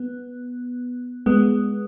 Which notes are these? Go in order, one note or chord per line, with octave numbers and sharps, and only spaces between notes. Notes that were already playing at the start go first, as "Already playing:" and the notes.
Already playing: B3
G#3 B3